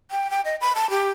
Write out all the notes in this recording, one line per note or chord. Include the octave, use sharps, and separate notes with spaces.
G5
G5
D#5
B5
A5
G4